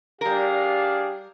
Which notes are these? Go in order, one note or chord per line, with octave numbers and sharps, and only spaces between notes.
G3 D4 G4 G#4 A#4 F5